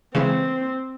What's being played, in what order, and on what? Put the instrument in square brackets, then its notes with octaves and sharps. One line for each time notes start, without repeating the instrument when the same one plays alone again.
[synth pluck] C#3 E3 G#3 [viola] C4